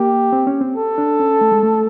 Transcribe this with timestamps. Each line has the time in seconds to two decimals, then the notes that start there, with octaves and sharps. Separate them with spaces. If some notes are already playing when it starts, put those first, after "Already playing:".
Already playing: A#3 G4
0.33 C4
0.47 C#4
0.61 C4
0.76 A4
0.98 D4
1.20 C#4
1.41 A3
1.52 G#3
1.63 A3